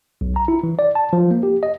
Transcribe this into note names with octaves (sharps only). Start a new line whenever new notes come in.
B1
A#5
E4
E3
D5
A5
F3
A#3
G4
D#5